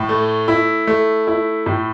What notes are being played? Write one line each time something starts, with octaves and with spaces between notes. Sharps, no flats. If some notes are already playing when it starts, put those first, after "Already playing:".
Already playing: A2
A3
E4
A3
E4
A2